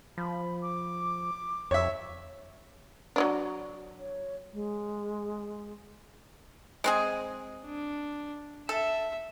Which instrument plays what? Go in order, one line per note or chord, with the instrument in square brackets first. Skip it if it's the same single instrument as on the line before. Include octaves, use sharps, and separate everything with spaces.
[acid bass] F3 [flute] B5
[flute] D6
[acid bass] F2 [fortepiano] C#5 E5
[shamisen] F#3 C#4 D4 [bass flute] F#4
[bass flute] C#5
G#3
[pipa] G#3 C4 G#4
[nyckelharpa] D4
[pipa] A4 [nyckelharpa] E5